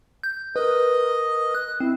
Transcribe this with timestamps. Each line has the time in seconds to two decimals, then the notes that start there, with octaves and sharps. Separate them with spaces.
0.23 G6
0.56 A#4 B4 D#5
1.54 F#6
1.80 C4 E4